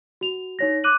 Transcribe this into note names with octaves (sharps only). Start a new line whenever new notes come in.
F#4 F7
D#4 C#5 A#6
D6 F#6 D#7 F#7